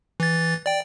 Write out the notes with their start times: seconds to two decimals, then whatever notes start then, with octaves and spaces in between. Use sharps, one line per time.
0.20 E3 A6
0.66 D5 G5